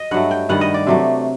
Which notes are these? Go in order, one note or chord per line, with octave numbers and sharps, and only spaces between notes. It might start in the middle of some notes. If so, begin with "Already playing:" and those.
Already playing: D#5
G2 F#3 A3 F#5
G5
G2 D#3 G3 F#5
D#5
D5
C3 F#3 A3